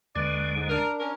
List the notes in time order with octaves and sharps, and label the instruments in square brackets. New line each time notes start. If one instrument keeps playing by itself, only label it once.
[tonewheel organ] D#2 D3 G#3 [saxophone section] C#4 B4 D5
[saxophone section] G#2
[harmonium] D4 [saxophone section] A#4
[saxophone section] C#4 A#4